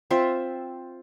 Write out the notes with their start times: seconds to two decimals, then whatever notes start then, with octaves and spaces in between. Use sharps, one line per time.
0.10 C4 F4 C5 E5